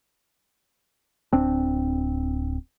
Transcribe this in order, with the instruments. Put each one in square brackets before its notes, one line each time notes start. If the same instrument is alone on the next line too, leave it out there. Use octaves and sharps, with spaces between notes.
[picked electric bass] D1 C4 D4